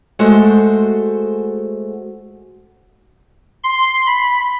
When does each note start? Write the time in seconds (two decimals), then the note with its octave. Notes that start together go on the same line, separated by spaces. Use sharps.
0.19 G#3 A3 F#4 C5
3.64 C6
4.06 B5